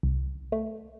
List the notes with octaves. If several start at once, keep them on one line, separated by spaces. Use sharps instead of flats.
C2
A3